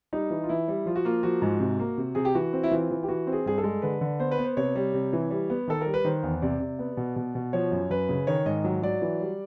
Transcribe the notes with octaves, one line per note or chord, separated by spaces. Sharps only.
G3 D#4
E3
F4
E3 E4
G3
F3 F4
F#4
A#3 F4
F3 F#4
G#2
C3
A#3
C3
C3 G#4
G4
E3 F#4
C4
E4
E3 F4
E3
G4
E3 F#4
C4
G#4
G2 G#4
A4
G#3
D3 B4
D3
B3 C5
B4
B3
C5
C3 C#5
G3
C3
E3
G3
B3
D#3 A4
G3 A#4
B4
D#3 C5
E2
C3 D5
C3
B3
B2
B2
B2
F3 C#5
F#2
F#2 B4
C#3
D#3 C#5
G#2 D#5
F#3
F#3 D5
E3
G3